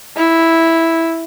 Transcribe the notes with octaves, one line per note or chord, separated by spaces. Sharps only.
E4